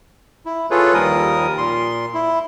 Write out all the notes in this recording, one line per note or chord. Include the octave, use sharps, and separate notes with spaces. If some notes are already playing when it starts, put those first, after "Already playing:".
E4
F4 G#4 A4 B4 C#5
D#2 F3 G3 A#4 D#6
A#2 C6
E4